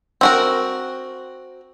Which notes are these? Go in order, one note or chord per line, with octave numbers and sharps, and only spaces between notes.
C4 F#4 A#4